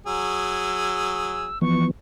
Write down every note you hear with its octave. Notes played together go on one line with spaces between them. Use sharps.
F#3 G#4 E6
E3 F3 B3 C#6